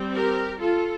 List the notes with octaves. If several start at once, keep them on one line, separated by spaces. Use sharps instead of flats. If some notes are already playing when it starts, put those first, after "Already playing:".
Already playing: G3 C4
G4 A#4
F4 A4